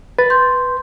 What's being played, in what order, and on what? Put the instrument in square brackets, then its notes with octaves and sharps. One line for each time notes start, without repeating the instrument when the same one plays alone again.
[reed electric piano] B4 [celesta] A6
[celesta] C6 G6